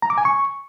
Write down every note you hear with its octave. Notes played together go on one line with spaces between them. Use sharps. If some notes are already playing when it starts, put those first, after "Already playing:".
A#5
D6
G#5
C#6